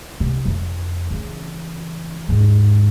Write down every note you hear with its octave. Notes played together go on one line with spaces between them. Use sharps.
C3 B3
F2 D3
C#3 E3
D#2 G#2